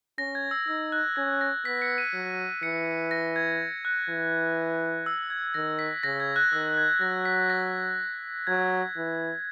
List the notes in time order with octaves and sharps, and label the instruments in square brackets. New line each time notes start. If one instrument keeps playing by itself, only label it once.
[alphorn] C#4 [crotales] A#6
[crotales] G#6
E6
[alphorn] D#4 [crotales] E6
[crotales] F#6
[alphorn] C#4 [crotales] G#6
[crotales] A#6
[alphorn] B3 [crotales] B6
[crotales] C#7
D#7
[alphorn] F#3
[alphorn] E3 [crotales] C#7
[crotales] A#6
G#6
F#6
[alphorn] E3
[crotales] E6
G#6
[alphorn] D#3 [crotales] A#6
[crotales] B6
[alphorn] C#3 [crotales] A#6
[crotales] G#6
F#6
[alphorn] D#3 [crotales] E6
[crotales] G#6
[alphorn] F#3 [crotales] A#6
[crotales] B6
A#6
[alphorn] F#3 [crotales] G#6
[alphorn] E3